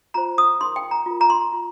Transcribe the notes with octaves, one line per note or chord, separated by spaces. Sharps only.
F4 C5 A#5
D#6
D#4 A#4 C6
G5
A#5
F4 A#4
A#5
C6
F4